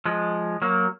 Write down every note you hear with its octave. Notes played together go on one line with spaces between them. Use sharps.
F3 G#3
F#3 A#3